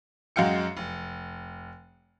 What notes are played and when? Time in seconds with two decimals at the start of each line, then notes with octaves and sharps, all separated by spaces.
0.36 F#2 G#3 F#4 F5 G5 C#7
0.77 F1